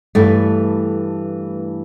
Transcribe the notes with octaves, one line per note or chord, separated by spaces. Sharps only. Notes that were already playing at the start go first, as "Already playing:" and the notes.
G2 E3 A3